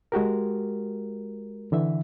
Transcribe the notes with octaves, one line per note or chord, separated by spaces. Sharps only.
G#3 F#4 G4 A#4
D3 E3 E5